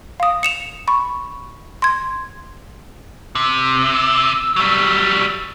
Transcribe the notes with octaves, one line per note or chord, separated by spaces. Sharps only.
F5 D#6
C#7 E7 F7
B5 C#6
C6 G#6
C3 E6
F#3 G3